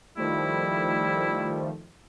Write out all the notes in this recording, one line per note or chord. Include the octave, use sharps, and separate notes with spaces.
D#3 F3 G3 A3 E4